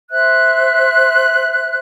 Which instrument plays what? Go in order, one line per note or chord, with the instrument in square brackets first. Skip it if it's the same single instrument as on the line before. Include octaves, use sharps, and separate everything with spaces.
[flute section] C5 E5 F#6